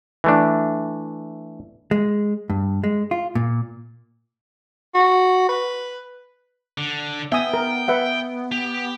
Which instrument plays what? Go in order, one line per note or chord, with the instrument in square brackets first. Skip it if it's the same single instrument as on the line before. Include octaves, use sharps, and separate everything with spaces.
[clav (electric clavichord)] E3 A3 D4
[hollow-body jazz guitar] G#3
G2
G#3
F4
A#2
[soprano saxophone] F#4
B4
[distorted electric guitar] D3
[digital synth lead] B3 [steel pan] E5 G#5 D#6 [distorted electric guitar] G5
[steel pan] A#4
B4 E5 F#5
[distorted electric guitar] G4